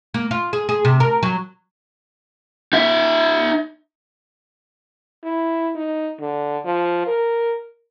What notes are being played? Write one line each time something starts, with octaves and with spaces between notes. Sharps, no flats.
A#3
F4
G#4
G#4
C3
A#4
F#3
D#4 E5
E4
D#4
D3
F3
A#4